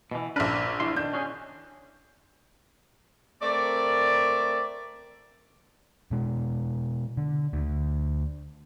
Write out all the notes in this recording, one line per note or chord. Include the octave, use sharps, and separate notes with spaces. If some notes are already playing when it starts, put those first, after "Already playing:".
B2 E3
A#1 D4 A#4 B4
E2 E4 C6
D#3 D4 G6
C#4 F#4 G#4
A3 C4 A#4 D5
B2 G#3
D3
D2